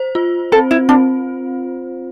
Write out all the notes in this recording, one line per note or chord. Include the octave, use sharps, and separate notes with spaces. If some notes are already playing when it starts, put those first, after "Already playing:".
Already playing: C5
F4
C4 A4
E4
C4 D4